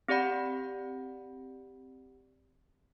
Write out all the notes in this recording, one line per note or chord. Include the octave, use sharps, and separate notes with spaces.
C4 G4 D5 F#5 B5